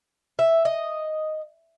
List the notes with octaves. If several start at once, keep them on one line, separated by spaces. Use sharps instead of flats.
E5
D#5